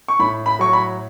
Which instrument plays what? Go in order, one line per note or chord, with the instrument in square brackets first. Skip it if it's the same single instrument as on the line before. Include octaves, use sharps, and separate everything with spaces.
[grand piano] C#6
A2 B5
B5
F#3 C#6
B5